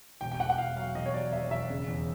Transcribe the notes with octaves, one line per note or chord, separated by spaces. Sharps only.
E1 G5
G5
E1 F#5
F#5
E1 F5
F#3 F5
E1 D#5
C#5
F#3 D5
D#2 E5
E1 E5
C#3
E2